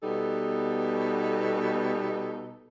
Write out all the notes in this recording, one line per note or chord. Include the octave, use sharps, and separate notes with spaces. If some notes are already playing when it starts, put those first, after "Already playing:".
B2 G3 B3 D#4 A4